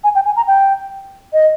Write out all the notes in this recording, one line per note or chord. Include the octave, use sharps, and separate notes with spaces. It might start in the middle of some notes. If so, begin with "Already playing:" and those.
G#5
G5
G#5
A#5
G5
D#5